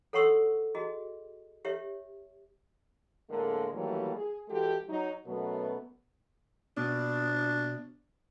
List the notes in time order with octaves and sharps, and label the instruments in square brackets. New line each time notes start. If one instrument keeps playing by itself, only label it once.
[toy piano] A4 C#5 F#5 C6 C#6 E6
F#4 G#4 D#5
G4 C#5 E5
[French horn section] A2 D3 G#3 A#3 A#4
D#3 E3 F#3 G3 A3 A#3
G#4
E3 G#3 F#4 G4 A4
F#3 D#4
F#2 B2 F#3 A3 B3
[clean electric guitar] B2 [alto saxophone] D4